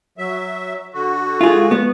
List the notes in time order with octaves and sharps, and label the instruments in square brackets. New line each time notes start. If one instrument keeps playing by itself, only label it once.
[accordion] F#3 E5
D3 F#4
[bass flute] G#3 [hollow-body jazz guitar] F4 G#4
[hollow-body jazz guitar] B3